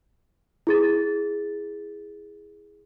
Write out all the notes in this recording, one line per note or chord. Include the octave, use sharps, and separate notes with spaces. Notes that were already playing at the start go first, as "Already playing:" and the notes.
E4 G#4 A6